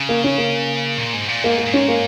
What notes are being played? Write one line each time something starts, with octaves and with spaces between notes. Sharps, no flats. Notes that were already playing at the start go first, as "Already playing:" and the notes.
Already playing: C#3
A#3
C#4
A#3
A#2
G#2
A#2
G#2 A#3
A#3
G#2
C#4
A#3